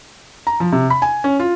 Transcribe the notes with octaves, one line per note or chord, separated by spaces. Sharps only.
A#5
F3
C3
B5
G#5
C#4
F4